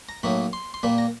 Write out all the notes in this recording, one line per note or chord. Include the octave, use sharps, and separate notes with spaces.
A#5
A2 F#3 A#3 D#4 B5
C6
C6
A#2 G3 A#3 B5
A#5